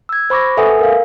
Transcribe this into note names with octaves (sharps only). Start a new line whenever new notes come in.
E6 G#6
C5 B5 C#6 D6 A#6
A4 B4 E5 F#5 G#5 D#6
A#4 F5